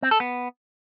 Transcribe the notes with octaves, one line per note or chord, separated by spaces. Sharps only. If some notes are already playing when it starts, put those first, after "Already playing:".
C4
A4
B3